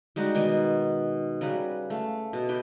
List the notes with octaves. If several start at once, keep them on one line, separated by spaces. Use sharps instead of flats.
G3 G#3 D#4 F#4
B2 D#3 G#5 D6
C#3 F#3 G3 B4
A3 F5
B2
G4 B4 C6